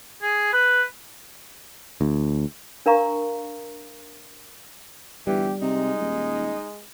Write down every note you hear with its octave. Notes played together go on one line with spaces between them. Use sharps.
G#4
B4
D2
D4 A#4 F5 A#5 C#6
G1 E3 G3 G4
C3 G#3 D#4
D#1